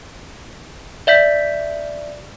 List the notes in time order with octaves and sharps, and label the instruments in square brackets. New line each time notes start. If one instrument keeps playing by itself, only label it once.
[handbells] D5 E5 G6 B6